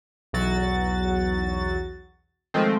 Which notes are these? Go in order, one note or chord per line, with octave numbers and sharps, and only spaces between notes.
B1 E2 F#3 F#4 A6
D#3 F3 G#3 A3 C4